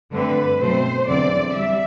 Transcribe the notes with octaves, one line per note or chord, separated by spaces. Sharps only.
G2 D3 A3 C4 B4
B2 F#3 A3 C4 C5
E2 D3 F#3 C4 D5
G3 E5